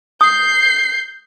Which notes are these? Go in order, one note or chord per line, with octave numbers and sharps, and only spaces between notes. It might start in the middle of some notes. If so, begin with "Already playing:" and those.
D#6 G6 C7